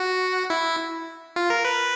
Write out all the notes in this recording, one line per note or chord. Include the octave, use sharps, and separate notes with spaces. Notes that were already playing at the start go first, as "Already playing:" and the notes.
Already playing: F#4
E4
F4
A#4
B4